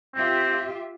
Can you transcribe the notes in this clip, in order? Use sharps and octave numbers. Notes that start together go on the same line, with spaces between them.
C4 F4 G4 E5